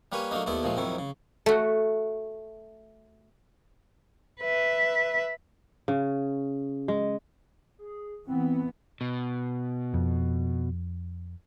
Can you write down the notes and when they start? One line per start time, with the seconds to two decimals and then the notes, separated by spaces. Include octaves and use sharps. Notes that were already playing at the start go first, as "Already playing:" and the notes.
0.12 G3 A#3 B4 C#5 G#5
0.31 F#3 A3 A#3 D4 D#4
0.46 D#2 A3 B3 E4 D5
0.63 A#2 F3 G#3 A3
0.77 F2 G#2 D#3 F#3 E4
0.99 C#3
1.46 A3 F#4
4.42 B4 E5
5.88 C#3
6.88 G#3
7.79 G#4
8.27 E3 B3 C4
9.01 B2
9.94 F2